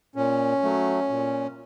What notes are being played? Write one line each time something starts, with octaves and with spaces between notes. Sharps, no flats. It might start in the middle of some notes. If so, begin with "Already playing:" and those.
A#2 C#4
F#3 A3
A#2